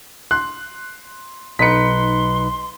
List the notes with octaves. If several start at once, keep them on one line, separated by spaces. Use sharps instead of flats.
C6 F#6
B1 D#4 B4 C6 B6 C#7